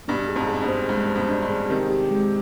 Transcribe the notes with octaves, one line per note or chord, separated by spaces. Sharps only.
G2 B2 D4
G#4
F2 G#2
G#4
G2 B2
C5
G2 G#3
C5
G2 B2
D4
G2
G#4
C3 D#3 G4
G4
G#3